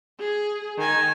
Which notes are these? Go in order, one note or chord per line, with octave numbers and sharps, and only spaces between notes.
G#4
D#3 G#5